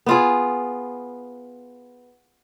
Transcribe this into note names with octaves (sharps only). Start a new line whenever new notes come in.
B3 F4 G#4